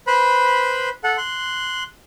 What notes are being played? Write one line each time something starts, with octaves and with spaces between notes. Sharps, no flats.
B4 C5 B5
A4 F#5
C6 F#6